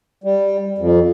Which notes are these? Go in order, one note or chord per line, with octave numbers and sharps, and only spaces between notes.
G3
F2